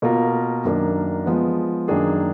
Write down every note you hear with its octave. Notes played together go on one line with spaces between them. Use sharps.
B2 A#3 F4 A#4
F#2 D#3 A#3 D4
F3 G#3 B3
F#2 D#3 A#3 D4 G#4